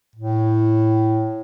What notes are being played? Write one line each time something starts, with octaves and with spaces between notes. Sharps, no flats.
A2